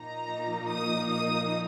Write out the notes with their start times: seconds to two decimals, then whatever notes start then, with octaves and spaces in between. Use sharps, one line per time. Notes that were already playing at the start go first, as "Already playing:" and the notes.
Already playing: A#2 F3 A#3 D#4 A#5
0.69 D#6
1.10 D#6